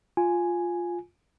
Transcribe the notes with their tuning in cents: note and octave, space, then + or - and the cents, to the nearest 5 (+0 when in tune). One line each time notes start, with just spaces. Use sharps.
F4 +5 G#5 +0